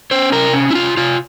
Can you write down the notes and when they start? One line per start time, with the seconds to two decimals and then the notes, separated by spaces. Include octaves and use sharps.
0.11 C#4 C5
0.32 C3 A#4
0.53 C#4
0.71 E4
0.75 C3 F4
0.97 C3 F4